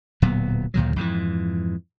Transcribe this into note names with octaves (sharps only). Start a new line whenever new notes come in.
D1 A#2 F#3 B3
D2 A#2 D#3 F#3
F2 G#2 B2 E3